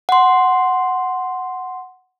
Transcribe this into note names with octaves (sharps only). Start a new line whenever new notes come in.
F#5 C6